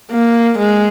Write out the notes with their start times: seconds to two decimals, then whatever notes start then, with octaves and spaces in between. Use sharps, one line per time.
0.11 A#3
0.59 G#3